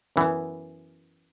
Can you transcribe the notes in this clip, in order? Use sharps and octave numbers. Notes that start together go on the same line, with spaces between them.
F#2 E3 B3